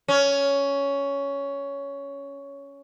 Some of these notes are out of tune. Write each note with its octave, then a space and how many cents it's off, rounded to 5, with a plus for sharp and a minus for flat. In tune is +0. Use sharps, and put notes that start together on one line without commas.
C#4 +10